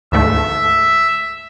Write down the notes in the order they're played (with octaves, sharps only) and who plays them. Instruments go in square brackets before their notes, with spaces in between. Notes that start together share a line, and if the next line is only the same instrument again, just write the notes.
[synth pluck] D2 G#2 A3 [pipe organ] E5